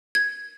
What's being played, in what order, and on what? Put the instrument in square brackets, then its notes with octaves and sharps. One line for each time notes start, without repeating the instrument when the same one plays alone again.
[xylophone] G#6